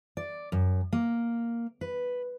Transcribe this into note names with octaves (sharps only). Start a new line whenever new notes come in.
D5
F#2
A#3
B4